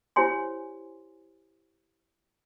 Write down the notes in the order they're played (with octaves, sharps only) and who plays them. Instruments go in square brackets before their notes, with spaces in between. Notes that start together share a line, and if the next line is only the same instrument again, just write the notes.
[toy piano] E4 G4 C5 C#5 G#5 C6